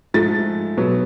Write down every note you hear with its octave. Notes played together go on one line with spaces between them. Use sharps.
G#2 F3 A3 A6
B2 F#3 B3